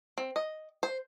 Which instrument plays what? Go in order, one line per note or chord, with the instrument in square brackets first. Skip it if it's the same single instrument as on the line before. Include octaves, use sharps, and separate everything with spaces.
[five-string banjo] C4
D#5
C5